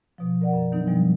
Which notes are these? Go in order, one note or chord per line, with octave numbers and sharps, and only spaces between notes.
B2 F3
A#4 D5 F#5
F#2
D#3 F#3 B3 D4 D#4
B2 F3 G3 B3